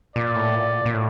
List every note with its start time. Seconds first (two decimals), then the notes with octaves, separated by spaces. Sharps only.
0.16 A#2 D5
0.36 A2
0.55 A#2
0.86 A#2
0.94 A2